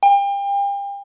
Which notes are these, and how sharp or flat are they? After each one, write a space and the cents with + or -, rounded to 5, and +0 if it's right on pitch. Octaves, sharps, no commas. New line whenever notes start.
G5 +35